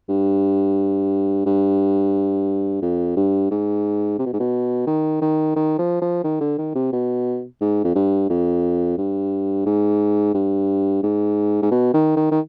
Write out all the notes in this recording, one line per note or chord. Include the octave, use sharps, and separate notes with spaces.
G2
G2
F2
G2
G#2
C3
B2
G#2
B2
D#3
D#3
D#3
F3
F3
D#3
D3
D#3
C3
B2
G#2
F2
G2
F2
G2
G#2
G2
G#2
G#2
B2
D#3
D#3
D#3